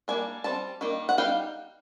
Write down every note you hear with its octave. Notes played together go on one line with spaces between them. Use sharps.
G3 A#3 D4 G#5
G3 C4 A5
D#3 G3 A#3 D#4
F#5
G3 B3 D#4 F5 G5